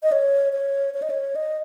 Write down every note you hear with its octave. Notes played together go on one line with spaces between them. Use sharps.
D#5
C#5
C#5
C#5
D#5
C#5
D#5